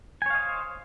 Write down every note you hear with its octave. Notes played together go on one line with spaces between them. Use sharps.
C5 C#5 D#5 F5 G#5